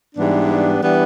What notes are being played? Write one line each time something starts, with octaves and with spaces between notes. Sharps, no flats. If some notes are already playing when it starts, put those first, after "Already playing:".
G#2 E3 G3 B3 D4
E3 G3 B3 D4